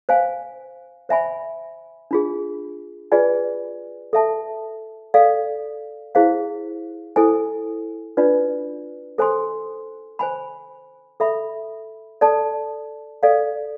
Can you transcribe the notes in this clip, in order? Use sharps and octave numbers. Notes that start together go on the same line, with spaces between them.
C5 F5 G#5
C5 E5 G#5 B5
D4 F4 G#4
F4 G#4 B4 D5 G#5
A4 E5 A5
A4 D5 F5
E4 G#4 C5 F5
E4 A4 C5 G#5
D4 F4 B4 D5
A4 C5 G#5 C6
C5 G#5 B5
A4 E5 B5
A4 D5 A5
A4 D5 F5